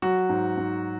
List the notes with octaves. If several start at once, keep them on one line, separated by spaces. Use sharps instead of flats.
F#3 F#4
G#2
G#2